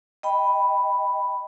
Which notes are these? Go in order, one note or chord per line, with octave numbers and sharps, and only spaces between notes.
D#5 G5 B5